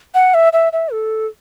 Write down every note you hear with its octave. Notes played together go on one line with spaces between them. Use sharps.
F#5
E5
E5
E5
A4